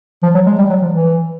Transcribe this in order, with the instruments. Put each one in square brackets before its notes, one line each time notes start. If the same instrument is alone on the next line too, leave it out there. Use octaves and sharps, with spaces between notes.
[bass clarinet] F3
F#3
G#3
G3
F#3
F3
E3